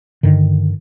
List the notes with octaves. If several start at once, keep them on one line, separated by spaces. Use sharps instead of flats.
G2 D3 D#3